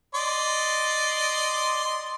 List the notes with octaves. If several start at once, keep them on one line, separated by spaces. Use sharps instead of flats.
D5 D#5 C6